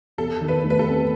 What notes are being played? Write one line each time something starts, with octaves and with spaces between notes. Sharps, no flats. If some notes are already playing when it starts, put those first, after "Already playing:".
E2 A4
D#3
B4
A3
B4
A4
C4